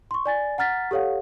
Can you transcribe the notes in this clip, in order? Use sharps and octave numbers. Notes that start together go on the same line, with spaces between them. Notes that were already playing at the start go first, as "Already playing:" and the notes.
C6 C#6
D5 G#5 A6
F#5 A#5 F6 A6 B6
G4 A4 C#5 F5 F#5